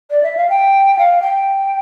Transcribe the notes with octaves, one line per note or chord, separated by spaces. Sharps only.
D5
E5
F5
G5
F5
G5